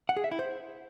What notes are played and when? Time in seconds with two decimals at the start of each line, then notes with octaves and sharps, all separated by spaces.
0.09 F#5
0.17 G#4
0.24 E5
0.31 E4
0.39 C5